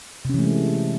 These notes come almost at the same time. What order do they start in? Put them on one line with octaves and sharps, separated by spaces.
C3 C#4 E3 A3 G#3